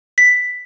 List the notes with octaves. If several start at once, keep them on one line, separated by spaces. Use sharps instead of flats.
B6